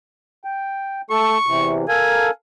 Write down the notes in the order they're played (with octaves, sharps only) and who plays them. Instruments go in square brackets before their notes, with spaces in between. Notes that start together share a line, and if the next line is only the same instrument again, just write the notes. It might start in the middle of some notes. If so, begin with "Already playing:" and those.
[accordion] G5
[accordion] A3 A4 [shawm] C#6
[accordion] E2 C3 E3
[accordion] A4 A#4 F5 [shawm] G#5